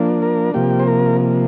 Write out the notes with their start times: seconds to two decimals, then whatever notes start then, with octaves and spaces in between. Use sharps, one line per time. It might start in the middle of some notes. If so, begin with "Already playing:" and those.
Already playing: F3 A#3 D4
0.22 A#4
0.54 C3 F3 A#3 G4
0.79 C5
0.87 A#4